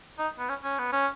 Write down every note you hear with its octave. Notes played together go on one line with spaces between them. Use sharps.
D#4
B3
C#4
C#4
B3
C#4